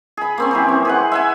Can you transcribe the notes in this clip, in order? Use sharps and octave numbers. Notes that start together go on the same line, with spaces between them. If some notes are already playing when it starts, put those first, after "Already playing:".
G#4 B5
A#3 C4 C#4
E3 F#3 G4
C4
G#4 B4 F#5
E5 F#5 G#5